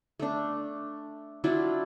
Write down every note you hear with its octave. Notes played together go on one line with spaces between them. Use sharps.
A3 D4
F#3 D4 E4 F4